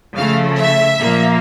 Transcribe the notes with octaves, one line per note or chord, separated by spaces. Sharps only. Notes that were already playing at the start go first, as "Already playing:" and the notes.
C#3 F3 A3 F5
E5
A#2 F3 A#3